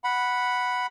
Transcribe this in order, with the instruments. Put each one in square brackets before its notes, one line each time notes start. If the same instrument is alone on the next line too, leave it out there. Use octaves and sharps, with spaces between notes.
[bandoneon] F#5 B5